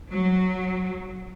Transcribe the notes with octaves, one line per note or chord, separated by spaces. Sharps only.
F#3